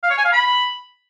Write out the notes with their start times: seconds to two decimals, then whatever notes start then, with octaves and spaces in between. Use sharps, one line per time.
0.03 F5
0.10 C#5
0.18 G#5
0.25 F5
0.32 B5